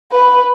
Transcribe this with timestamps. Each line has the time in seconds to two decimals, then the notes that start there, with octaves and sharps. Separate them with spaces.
0.11 B4